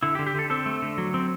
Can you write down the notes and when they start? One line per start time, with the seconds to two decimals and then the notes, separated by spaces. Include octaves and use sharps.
0.03 D3 E4
0.15 G4
0.19 D3
0.27 G4
0.35 D3 A4
0.50 C4 A4
0.66 A3
0.82 D3
0.98 F#3
1.14 C4